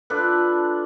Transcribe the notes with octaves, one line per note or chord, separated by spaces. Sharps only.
D4 F4 A4 B4